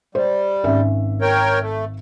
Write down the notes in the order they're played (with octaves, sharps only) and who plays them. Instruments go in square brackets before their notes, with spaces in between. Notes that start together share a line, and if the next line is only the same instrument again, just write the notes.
[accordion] G3 [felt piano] C5
[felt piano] G#1 C#4 E5
[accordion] A#4 C#5 G5
A3